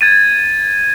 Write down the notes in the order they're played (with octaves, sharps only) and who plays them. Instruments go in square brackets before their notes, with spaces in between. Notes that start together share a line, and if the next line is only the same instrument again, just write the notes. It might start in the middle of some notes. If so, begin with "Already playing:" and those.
[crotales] G#6 A6 D#7